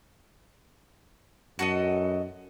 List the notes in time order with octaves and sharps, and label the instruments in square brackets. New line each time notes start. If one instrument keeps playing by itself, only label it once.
[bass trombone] F#2 [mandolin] F#4 A4 D#5